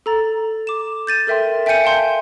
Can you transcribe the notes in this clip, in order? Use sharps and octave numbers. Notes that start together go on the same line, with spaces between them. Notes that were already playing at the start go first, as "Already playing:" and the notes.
A4 A#5 A6
D6 E7
G6 A6 D#7 E7
A4 A#4 E5 G5 C6
E5 G5 G#5 G6 C#7 D#7
F5 G5 A5 C6 G6